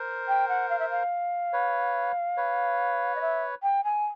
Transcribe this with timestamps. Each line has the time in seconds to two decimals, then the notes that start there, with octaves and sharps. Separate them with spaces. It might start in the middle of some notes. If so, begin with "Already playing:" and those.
Already playing: A#4 C5
0.28 G5
0.48 F#5
0.69 F5
0.79 E5
0.90 F5
1.53 B4 C#5
2.37 B4 C#5
3.15 D#5
3.21 E5
3.62 G5
3.84 G#5